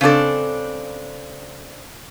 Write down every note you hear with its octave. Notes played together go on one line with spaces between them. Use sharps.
C#3 C4 D4 A4